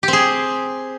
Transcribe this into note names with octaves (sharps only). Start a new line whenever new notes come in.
G4
C4
G#4